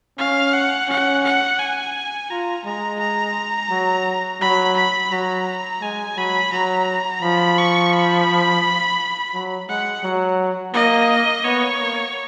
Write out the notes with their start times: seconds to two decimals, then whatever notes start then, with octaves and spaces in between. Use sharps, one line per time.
0.18 C#4 F5
0.53 F#5
0.88 C#4 F#5
1.24 F#5
1.60 G#5
2.30 F4 A#5
2.65 G#3 A#5
3.00 A#5
3.70 F#3
4.41 F#3 B5
4.77 B5
5.11 F#3 A#5
5.81 G#3 G#5
6.17 F#3 B5
6.52 F#3 A#5
7.22 F3 B5
7.58 C#6
7.92 B5
9.34 F#3
9.68 G#3 F#5
10.03 F#3
10.74 A#3 D#5
11.44 B3 C#5
11.80 A#3